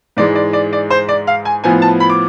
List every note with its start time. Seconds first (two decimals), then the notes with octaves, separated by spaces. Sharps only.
0.17 G#2 E3 G#3 D5
0.35 D5
0.53 D5
0.73 D5
0.90 C5
1.09 D5
1.27 F5
1.45 G#5
1.64 A2 F3 B3 G#5
1.82 A5
2.00 B5
2.10 D6